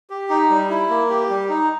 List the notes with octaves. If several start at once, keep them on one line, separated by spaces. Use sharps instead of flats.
G4
D#4
G3
E4
A#3
G4
G3
D#4